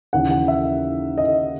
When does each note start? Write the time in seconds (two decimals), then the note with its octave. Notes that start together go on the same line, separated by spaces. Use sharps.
0.13 D#2 C#3 E3 F#5
0.31 F#5
0.48 E5
1.18 D#5